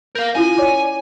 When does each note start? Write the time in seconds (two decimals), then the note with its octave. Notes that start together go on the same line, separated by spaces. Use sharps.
0.15 A#4 F5 G6
0.35 C#4 E4 F4 G#5
0.58 C#5 D5 D6